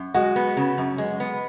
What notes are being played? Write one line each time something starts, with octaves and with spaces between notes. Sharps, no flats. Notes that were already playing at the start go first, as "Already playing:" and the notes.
Already playing: F#2
G#3 F#4
B3
C#3
F#2
G#3
B3